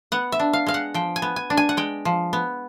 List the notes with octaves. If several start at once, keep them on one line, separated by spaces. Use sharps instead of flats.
B3 F#5
E5
D4
F5
G#3 F5
F#5
F3 G5
G#5
B3
G#5
D4
G#5
F#5
G#3 G5
F3
B3